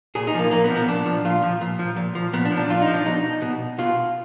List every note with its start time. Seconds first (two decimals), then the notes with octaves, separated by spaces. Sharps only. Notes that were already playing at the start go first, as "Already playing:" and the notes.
0.15 A#2 G#4
0.27 D#4
0.34 F3 A#3
0.51 A#2 A#3
0.64 B3
0.70 F3
0.76 B3
0.88 A#2 D4
1.06 F3
1.25 A#2 F4
1.42 F3
1.61 A#2
1.79 F3
1.96 A#2
2.15 F3
2.33 A#2 B3
2.45 D4
2.51 F3
2.57 D4
2.69 A#2 F4
2.82 D#4
2.87 F3
2.94 D4
3.06 B2 D#4
3.42 B2
3.78 B2 F4